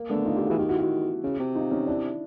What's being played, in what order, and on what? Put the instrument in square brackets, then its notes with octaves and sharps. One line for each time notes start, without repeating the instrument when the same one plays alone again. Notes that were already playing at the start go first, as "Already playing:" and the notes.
Already playing: [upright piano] A#3
[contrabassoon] D3 [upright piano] A3 B3
[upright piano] D#4 F4
F4 G4
F#4 G#4
[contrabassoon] E3
[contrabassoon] D#3 [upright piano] F4 G4
[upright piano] E4 F#4
E4 F#4
[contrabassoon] C#3
C3
[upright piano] D#4 F4
C#4 D#4
D4 E4